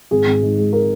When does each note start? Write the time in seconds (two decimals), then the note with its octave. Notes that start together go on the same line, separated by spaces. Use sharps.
0.11 G#1 G#4
0.27 G#1
0.42 G#2
0.58 G#3
0.73 A#4